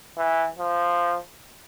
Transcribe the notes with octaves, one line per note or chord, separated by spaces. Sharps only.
E3
F3